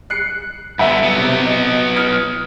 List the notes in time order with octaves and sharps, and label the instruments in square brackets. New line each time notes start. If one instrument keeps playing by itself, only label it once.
[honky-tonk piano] F#6 C7 C#7
[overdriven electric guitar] G2 D3 [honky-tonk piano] E5 F#5
[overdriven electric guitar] F#3 B3
[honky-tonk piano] C3
D#5
D#6 F6 G#6